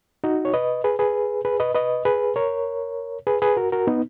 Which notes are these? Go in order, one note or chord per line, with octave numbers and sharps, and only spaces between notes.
D#4 F#4
C#5
B4 D#5
G#4 B4
G#4 B4
G#4 B4
B4 D#5
B4 D#5
G#4 B4
A#4 C#5
G#4 B4
G#4 B4
F#4 A#4
F#4 A#4
B3 D#4